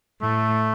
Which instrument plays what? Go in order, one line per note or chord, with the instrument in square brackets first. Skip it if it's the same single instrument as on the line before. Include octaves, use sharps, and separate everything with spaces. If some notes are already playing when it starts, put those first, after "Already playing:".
[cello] A2 [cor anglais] A3